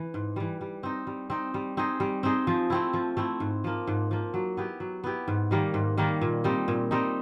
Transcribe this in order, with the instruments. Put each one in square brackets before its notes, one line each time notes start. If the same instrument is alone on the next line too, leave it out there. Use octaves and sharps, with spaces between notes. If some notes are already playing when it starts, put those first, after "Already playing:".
Already playing: [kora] E3
G#2
E3 G3
G3
C4 D#4
G3
C4 D#4
G3
C4 D#4 G#4
G3
C4 D#4 G#4
F3
A3 C4 E4
F3
A3 C4 E4
G#2
F3 A#3
G#2
F3 A#3
F#3
B3 E4 G4
F#3
B3 E4 G4
G#2
D#3 G3 A#3
G#2
D#3 G3 A#3
A#2
G3 C4 D#4
A#2
G3 C4 D#4